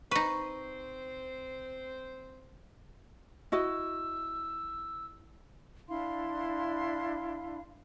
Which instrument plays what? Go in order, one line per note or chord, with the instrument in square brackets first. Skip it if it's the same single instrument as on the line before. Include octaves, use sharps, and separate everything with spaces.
[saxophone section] C4 C5 [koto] D#4 B4 [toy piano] C#6
[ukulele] E4 F#4 D#5 [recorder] E6
[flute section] D4 E4 F5 C6